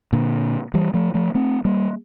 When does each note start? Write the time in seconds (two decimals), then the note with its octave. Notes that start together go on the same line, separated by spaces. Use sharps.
0.13 A#2 D3
0.74 E3 G3
0.94 F3 A3
1.14 F3 A3
1.35 A3 C4
1.65 G3 A#3